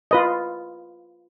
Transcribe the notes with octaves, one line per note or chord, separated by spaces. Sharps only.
F4 B4 D#5